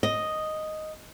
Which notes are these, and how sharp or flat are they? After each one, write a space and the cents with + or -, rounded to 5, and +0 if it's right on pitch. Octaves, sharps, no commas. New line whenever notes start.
D#5 +0